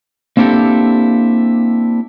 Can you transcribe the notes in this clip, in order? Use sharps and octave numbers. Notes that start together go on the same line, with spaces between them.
A#3 C4 D4 E4 G4 A4